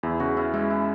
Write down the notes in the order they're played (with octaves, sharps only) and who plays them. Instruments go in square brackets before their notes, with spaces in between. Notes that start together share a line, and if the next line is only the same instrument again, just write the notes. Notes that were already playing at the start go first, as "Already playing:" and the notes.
[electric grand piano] E2 [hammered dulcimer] E4
[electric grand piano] C#3 [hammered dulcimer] F#4
[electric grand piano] C#4 [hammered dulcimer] E4
[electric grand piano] G#3 [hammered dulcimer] E4
[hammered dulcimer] E4